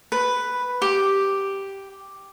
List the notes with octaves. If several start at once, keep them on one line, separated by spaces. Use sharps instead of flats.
B4
G4